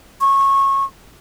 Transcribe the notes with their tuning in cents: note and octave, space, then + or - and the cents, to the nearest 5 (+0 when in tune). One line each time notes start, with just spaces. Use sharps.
C#6 -20